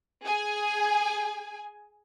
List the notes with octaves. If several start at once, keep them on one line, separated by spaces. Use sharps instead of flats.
G#4 G#5